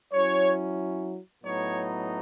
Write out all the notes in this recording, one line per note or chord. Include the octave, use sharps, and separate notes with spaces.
F#3 C#4 E4 C#5
A2 F#3 B3 D#4 C#5